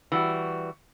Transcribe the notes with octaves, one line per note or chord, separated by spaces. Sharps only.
E3 G3 F#4